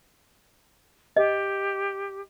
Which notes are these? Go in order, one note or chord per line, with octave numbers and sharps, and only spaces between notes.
G4 D#5